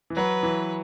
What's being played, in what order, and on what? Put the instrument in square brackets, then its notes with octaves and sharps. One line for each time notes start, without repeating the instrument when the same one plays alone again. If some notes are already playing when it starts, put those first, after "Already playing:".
[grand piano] E3
[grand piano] F#3 [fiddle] B4
[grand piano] E3